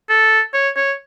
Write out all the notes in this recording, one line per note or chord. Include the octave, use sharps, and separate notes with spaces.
A4
C#5
C#5